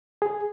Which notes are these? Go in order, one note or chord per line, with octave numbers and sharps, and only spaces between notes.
G#4